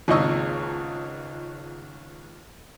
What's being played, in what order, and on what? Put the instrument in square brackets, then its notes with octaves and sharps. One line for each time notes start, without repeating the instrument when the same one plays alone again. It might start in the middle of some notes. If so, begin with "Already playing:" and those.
[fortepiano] G#1 C#2 A#2 D#5 C#6 E6